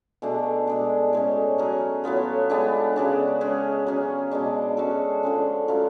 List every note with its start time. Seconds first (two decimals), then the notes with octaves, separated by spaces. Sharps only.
0.22 B2 A3 D4 G#4
0.67 B2 G#3 D4
1.13 A2 G#3 C#4
1.58 F#3 C#4 G#4
2.04 A2 F#3 B3 F4
2.50 G#3 B3 D4 G#4
2.96 C#3 G#3 D4 F#4
3.41 G#3 C#4 G#4
3.87 F#3 C#4 G#4
4.31 B2 G#3 D4
4.77 G#3 C#4 F#4 A4
5.23 D3 F3 G#3 C#4
5.68 F#3 A3 C#4 F4